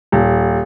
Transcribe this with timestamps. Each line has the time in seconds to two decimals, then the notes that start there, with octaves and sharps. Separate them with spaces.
0.12 D#1